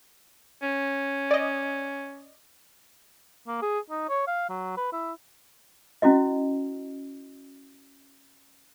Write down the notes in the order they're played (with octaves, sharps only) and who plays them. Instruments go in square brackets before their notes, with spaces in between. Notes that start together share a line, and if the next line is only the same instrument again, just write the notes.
[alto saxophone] C#4
[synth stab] D5 D#5
[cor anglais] A#3
G#4
D#4
C#5
F5
F#3
B4
E4
[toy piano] C#4 E4 F#4 D#5